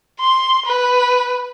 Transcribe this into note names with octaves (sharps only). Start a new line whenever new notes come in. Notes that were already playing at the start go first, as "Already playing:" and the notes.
C6
B4